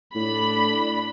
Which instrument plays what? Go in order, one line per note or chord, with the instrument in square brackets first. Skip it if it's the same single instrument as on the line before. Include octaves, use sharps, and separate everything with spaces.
[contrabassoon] A2 [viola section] D4 B5